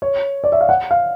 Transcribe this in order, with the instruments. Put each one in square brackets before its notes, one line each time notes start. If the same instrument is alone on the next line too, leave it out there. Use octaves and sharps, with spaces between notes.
[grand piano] C#5
D5
E5
F5
F#5
F5